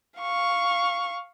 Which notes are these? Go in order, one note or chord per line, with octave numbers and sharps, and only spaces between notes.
F5 C#6